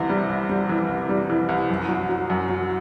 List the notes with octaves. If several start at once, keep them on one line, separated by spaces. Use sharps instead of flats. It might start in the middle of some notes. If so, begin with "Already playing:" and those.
Already playing: C2 C3 E3
G3
C2
G3
E3
C2
G3
E3
C2
F#2
F#3
F#3
F#2
F#3